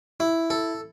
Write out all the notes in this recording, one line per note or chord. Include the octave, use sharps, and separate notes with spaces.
E4
A4